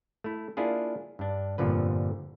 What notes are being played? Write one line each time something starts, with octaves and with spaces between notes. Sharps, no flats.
A3 E4
A#3 D4 E4 F4 G#4
G2 D4
G1 F2 A#2 D3 F3 B4